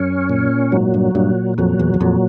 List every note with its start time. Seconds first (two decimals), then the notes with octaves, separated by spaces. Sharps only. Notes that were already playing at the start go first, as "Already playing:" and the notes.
Already playing: F#2 C#4
0.30 A#2
0.72 G#2 F#3
0.94 G2
1.15 G2 A#2
1.58 F2 F#3
1.79 E2
1.94 E2
2.00 F2 A#2